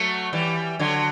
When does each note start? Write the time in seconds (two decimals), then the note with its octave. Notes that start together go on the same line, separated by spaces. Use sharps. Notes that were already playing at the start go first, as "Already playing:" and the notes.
Already playing: F#3 A3
0.33 E3 G3
0.79 D3 F#3